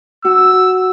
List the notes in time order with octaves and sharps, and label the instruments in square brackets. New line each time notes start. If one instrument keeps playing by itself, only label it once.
[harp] F#4 [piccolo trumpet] E6